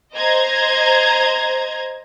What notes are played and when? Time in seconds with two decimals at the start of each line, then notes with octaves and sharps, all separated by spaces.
0.14 C5 D#5 A#5 G#6